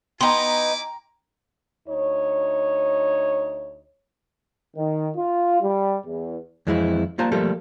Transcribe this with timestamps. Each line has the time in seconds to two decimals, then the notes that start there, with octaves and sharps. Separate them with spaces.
0.21 B3 D#4 E4 G5 G#5 A#5 C6 D6
1.87 D2 D#4 C#5
4.76 D#3
5.16 F4
5.62 G3
6.05 E2
6.67 F2 E3 G#3 C4 E4
7.18 G3 A#3 F4 C5 A5 A#5
7.32 F3 G3 A3 A#3 G4 A4